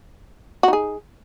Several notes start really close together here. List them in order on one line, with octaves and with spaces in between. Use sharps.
F#4 D#4 G#4